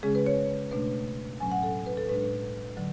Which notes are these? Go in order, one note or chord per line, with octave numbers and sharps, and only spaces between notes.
C#3 G#3 C#4 G#4
B4
C#5
B2 A3 D4 B4
A2 F#3 C#4 G#5
F#5
A4
B4
A4
A2 G#3 D4 B4
D3 F#3